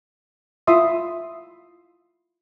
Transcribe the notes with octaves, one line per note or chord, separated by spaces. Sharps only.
E4 F4 E5 C6 D#6